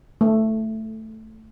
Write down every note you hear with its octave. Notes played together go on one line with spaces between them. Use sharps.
A3